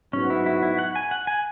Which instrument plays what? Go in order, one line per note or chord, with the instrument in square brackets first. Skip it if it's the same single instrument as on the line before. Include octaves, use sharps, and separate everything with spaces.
[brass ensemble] G#2 F#3 B3 F#4 [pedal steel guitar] C#4
[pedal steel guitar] E4
E4
E4
F#5
G#5
F#5
G#5